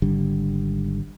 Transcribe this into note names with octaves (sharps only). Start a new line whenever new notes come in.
G#1 D3 G3